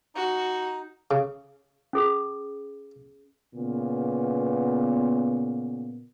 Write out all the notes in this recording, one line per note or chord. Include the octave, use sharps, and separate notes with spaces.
D#4 F#4
C#3
C#4 G#4 A4
A#2 C#3 B3